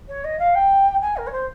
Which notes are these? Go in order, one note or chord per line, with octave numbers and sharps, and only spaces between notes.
C#5
D#5
F5
G5
G#5
A#4
C#5
C5